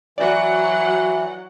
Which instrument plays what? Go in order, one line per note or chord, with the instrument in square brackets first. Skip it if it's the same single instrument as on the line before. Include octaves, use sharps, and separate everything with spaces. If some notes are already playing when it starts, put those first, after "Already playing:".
[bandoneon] E3 [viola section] F#3 F#5 [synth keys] F#4 D5